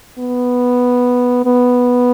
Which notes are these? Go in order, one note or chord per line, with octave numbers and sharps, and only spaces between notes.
B3
B3